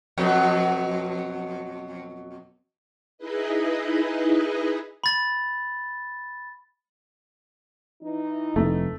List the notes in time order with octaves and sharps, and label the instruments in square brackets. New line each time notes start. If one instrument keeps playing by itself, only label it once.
[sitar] F2 B2 F#3
[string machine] D#4 E4 G#4 B4 D#5
[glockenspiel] B5 A6
[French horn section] E3 D#4
[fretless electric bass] F1 [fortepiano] A3